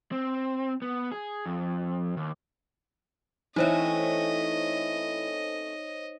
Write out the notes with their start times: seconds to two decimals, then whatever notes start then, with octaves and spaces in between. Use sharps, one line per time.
0.12 C4
0.82 B3
1.12 G#4
1.46 F2
2.17 D#2
3.56 E3 A3 C4 C#4 D#4 C5 C#5 D#5